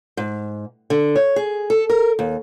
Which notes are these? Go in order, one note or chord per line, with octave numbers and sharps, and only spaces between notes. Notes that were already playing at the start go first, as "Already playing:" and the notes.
G#2
D3
C#5
G#4
A4
A#4
D#2